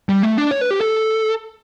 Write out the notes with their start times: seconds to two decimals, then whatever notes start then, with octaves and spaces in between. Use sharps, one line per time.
0.09 G3
0.23 A3
0.38 D4
0.51 C#5
0.61 B4
0.71 G4
0.81 A4